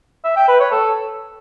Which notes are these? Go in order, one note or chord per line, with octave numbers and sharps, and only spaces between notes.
E5
G5
B4
C#5
A4